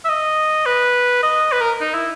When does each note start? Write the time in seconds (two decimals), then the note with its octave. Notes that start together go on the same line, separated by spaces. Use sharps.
0.05 E5
0.09 D#5
0.66 B4
1.23 D#5
1.52 B4
1.61 A#4
1.81 D#4
1.94 E4